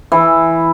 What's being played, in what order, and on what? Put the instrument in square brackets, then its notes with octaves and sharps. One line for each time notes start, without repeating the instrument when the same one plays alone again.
[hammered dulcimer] E3